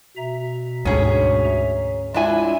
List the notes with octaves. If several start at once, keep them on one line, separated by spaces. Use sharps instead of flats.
B2 E5 A#5
D2 G#2 D3 C#4 G#4
G#3 D4 E4 F4 G#5